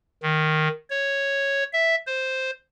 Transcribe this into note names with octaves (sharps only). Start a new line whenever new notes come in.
D#3
C#5
E5
C5